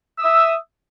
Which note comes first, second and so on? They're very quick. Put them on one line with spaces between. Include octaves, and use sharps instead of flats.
E6 D#6 E5